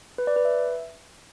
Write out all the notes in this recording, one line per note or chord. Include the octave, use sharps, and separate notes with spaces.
B4
D5
B4
E5